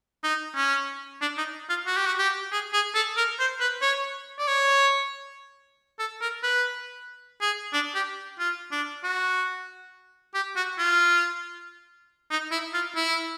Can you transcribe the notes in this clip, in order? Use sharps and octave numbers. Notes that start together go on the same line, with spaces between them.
D#4
C#4
D4
D#4
F4
F#4
G4
F#4
G4
G#4
G#4
A4
A#4
C5
B4
C#5
D5
C#5
A4
A#4
B4
G#4
D4
G4
F4
D4
F#4
G4
F#4
F4
D#4
E4
F4
E4